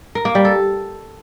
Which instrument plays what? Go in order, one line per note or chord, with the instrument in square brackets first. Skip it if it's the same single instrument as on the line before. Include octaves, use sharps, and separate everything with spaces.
[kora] A#4
A#3
G3
A4